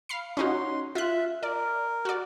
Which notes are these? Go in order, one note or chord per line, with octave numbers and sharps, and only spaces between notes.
F5 B5 C7
C#4 D#4 F#4 C6
F4 E5 F#6
A#4 D5
F#4 D5